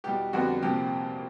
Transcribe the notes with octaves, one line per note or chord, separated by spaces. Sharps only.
E2 B2 G3 G4
F2 D3 G3 B3 F#4
C2 A#2 F3 G4